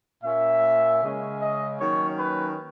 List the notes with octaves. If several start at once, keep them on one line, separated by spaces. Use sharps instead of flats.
A#2 A#3 C#4 E5
C#3 G#3 C#4
D#5
D#3 F#3 A#3 C#4 C#5
B4